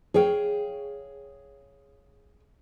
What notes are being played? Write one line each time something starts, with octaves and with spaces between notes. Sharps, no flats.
G#4 C#5 F5 G5